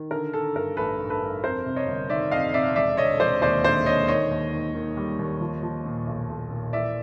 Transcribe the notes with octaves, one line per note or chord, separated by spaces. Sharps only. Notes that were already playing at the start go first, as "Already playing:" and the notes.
Already playing: D#3
D3 A#4
D3 A4
G2 A#4
A1 A4 B4
G2
A4 B4
G2
F2 A#4 C5
C3
C#5 D#5
G1
D#3 D5 E5
F2 D#5 F5
C3 D5 E5
E1 D5 E5
D3 C#5 D#5
E1 C5 D5
D#2 C5 D5
D3 C5 D5
D3 C#5 D#5
D#3 C#5 D#5
D#2
D#3
D#3
G3
D#2
F3
F3
A#2
B1
B1
A#2
E3 D5 E5